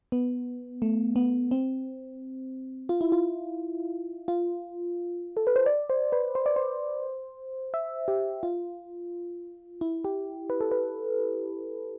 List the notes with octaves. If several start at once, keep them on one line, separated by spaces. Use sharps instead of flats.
B3
A3
B3
C4
F4
E4
F4
F4
A4
B4
C5
D5
C5
B4
C5
D5
C5
E5
G4
F4
E4
G4
B4
A4
B4